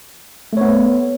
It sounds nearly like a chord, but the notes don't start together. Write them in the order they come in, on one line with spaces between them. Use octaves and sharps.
A3 C#5 B3